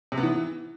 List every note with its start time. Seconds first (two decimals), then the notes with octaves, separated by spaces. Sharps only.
0.12 C3
0.18 B3
0.23 E3